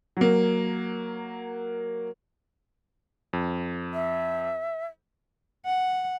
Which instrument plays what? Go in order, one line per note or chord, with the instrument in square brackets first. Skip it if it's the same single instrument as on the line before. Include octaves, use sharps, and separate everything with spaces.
[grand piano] F#3 A#3
[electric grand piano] F2
[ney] E5
[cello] F#5